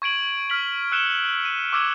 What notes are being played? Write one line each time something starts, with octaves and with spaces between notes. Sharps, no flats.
C#6 G#6 D7 F#7
F6 B6 F#7
E6 F#6 C#7 E7 G7
D#7
C#6 D6 E6 F6 G#6 C#7